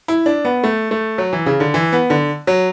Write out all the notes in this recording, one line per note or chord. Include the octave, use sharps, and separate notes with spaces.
E4
D4
B3
A3
A3
F#3
E3
C#3
D3
E3
B3
D3
F#3